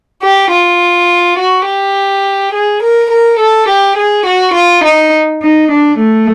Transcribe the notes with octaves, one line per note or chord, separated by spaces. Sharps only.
G4
F4
F#4
G4
G#4
A#4
A#4
A4
G4
G#4
F#4
F4
D#4
D#4
D4
A3